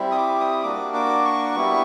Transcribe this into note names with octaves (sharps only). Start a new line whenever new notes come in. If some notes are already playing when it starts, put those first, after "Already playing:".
Already playing: G3 C4 E4
D#6
D6
D#6
A#3 D4 F#4 D6
D6
C#6
G3 B3 E4